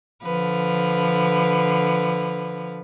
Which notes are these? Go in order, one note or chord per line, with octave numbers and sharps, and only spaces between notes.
D3 F3 B4